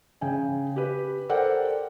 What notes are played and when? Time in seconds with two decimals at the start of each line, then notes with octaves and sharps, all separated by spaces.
0.21 C#3 G5 G#5
0.76 G4 B4
1.29 A4 A#4 C5 D5 F#5 G5